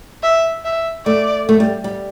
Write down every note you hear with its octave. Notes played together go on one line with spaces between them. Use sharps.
E5
E5
A3 D5
A3
G3
G3